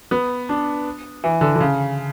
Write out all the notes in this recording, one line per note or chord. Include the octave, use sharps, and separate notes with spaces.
B3
D4
E3
D3
D3
C#3